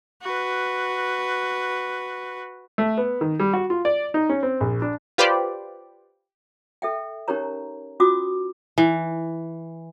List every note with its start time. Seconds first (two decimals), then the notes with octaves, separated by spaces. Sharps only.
0.22 F#4 B4
2.78 A3
2.98 B3
3.21 D#3
3.40 G3
3.54 F#4
3.70 F4
3.85 D5
4.14 D#4
4.29 C#4
4.43 C4
4.60 A#1
4.82 D4
5.18 F4 G4 B4 C5 D5
6.82 A4 E5 G5
7.28 C#4 D#4 G4 A#4 C#5 A#5
8.00 C#4 F4 F#4 D6 D#6
8.78 E3